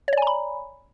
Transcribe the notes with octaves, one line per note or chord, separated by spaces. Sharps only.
C#5 D5 G#5 A#5 B5